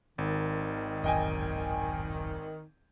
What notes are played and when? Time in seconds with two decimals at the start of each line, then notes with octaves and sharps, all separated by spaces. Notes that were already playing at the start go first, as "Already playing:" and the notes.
0.18 G#1 D#3
1.04 D1 A1 F#2 D#5 G5 G#5